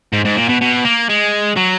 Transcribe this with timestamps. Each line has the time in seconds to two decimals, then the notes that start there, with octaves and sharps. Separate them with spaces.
0.13 G#2
0.25 G#2
0.36 A#2
0.49 B2
0.61 B2
0.85 A#3
1.10 G#3
1.57 F#3